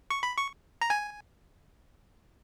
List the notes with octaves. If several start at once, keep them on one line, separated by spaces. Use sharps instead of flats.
C#6
B5
C#6
A#5
G#5